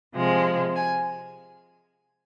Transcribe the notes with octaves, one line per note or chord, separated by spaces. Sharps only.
C3 F3 G#3
G#5